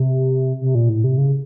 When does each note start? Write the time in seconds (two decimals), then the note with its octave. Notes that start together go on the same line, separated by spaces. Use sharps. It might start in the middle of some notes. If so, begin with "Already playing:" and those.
Already playing: C3
0.61 C3
0.75 A#2
0.89 A2
1.04 C3
1.18 C#3